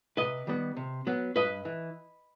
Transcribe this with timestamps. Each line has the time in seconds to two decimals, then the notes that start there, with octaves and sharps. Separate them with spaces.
0.17 C3 B4 D#5
0.47 D#3 G3 B3
0.77 C3
1.07 F#3 B3
1.36 G2 B4 D#5
1.65 E3